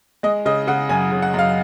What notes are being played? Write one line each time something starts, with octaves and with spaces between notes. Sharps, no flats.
G#3 D#5
C#3 D#5
C#3 F#5
F#2 G#5
C#3
F#5
F#2 F5